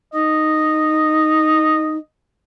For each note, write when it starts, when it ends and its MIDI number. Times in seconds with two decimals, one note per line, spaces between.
0.14 1.97 63
0.14 1.99 75